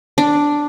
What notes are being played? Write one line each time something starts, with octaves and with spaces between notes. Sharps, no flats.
D4